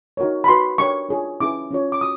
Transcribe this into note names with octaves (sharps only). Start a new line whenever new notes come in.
D#4 F#4 A#4 C#5
B5
F#4 B4 C6
D4 G4 A#4 C#5 C#6
D4 F4 G#4 C#5
C#4 E4 G#4 B4 D6
C#4 F4 G#4 C#5
D6
F#4 D#6